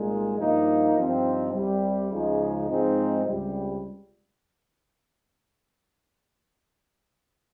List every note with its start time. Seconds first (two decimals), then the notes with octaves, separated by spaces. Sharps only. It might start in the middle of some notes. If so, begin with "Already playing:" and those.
Already playing: C2 A#2 G#3 D#4
0.39 G2 F3 A#3 D#4
0.96 G2 F3 C4 D#4
1.54 C2 C3 G3
2.11 C#2 C#3 F3 G#3 D#4
2.69 G#2 F3 G#3 C4 D#4
3.26 C#2 C3 G3